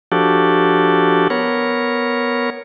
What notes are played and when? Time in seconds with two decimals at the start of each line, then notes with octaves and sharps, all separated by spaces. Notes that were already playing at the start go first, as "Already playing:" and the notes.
0.12 F3 D4 F#4 G4 A4
1.30 B3 A#4 C#5